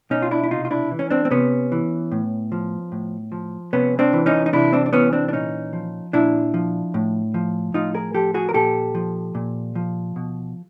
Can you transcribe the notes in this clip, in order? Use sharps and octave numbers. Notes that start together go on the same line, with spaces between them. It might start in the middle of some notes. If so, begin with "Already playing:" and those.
B2 C#4 D#4
F4
D4 E4
E4
C3 D#4 F4
F4
D4 E4
E3
C#4
C4 D4
C4
C3 B3 C#4
E3
A2
F3
A2
F3
C3 B3 C#4
C4 D4
E3
C#4 D#4
D#4
C3 D4 E4
C4 D4
D4
E3 B3 C#4
C4 D4
D4
A#2 C#4 D#4
F3
A#2 D4 E4
F3
A2
F3
A2 D#4 F4
G#4 A#4
F3 G4 A4
F#4 G#4
A#4
A#2 G4 A4
F3
A#2
F3
B2